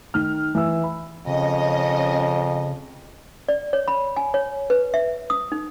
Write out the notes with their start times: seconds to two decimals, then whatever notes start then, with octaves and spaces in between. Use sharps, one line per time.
0.14 D#3 F6
0.55 E3 E6
0.83 B5
1.27 F2 C#3 C#4 D#5
3.48 D5
3.73 C#5
3.88 B5
4.17 G#5
4.34 C#5
4.70 B4
4.94 E5
5.30 D#6
5.52 D#4